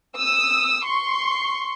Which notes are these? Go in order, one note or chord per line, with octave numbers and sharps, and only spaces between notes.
D#6 E6
C6 C#6